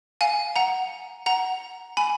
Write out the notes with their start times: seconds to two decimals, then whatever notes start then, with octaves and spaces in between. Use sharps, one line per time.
0.21 F5 G#5
0.56 F#5 A#5
1.26 F#5 A#5
1.97 G#5 B5